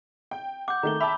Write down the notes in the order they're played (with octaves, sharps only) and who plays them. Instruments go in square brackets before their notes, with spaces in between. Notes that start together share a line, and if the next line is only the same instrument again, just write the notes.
[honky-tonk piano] G5
[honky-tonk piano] F#5 [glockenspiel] D6 G6
[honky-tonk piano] D#3 A3 [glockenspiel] A#5 G7
[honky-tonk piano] E5 G5 A5 [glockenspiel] B5 D6